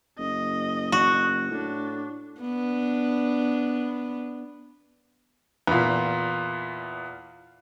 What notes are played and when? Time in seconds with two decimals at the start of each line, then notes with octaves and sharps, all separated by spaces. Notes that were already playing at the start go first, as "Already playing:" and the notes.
0.19 F#1 D#5
0.92 F#4
1.51 A2 D4
2.41 B3 D4
5.67 E2 A#2